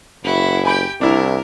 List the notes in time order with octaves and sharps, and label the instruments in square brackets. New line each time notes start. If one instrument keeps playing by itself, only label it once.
[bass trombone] F#1 [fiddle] E4 F#4
[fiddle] G4 G5 [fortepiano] G#5 B5
[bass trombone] C2 [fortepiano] D4 E4 [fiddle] A#4